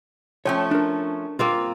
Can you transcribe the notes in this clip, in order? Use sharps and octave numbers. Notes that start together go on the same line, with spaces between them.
F3 A3 C#4 C#5 G5
D4 A#4
A#3 C4 F4